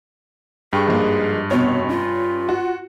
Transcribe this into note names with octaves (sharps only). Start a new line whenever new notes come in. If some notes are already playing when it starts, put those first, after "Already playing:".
G2 G#4 G5 C#6
G#2 F3 A#3
F1 B2 B3 C#5
C#4 F4
F#4